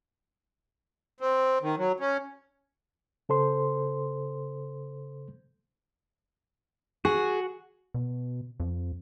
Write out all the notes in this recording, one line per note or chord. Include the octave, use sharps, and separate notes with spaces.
C4
D#3
F#3
C#4
C#3 A4 C5 C6
F#4 G#4
B2
F2